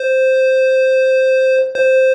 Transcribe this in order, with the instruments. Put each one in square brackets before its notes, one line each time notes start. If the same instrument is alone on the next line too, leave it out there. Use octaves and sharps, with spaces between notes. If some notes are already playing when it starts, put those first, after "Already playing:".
Already playing: [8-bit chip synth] C5
C5